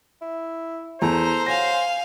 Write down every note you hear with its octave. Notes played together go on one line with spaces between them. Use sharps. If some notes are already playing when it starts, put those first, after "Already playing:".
E4
E2 A4 C5 A#5
F#3 F5 G#5 A#6